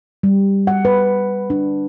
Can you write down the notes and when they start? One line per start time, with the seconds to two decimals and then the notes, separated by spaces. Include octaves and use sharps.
0.23 G3
0.67 F#5
0.85 B4
1.50 D4